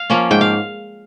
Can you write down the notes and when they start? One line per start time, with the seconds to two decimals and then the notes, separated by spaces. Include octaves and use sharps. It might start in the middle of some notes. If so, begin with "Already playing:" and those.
Already playing: F5
0.10 F3 A#3 C#4
0.31 G#2 G5
0.41 F5